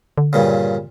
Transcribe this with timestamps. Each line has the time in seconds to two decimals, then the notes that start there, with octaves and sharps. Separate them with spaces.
0.18 D3
0.33 G2 A#2 C#3